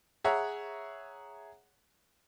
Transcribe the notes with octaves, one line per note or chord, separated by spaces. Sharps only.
G#4 C#5 E5 F#5 A#5